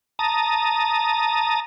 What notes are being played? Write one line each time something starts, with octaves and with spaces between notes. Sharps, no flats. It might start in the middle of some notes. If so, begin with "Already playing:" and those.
A5 A#5 D#6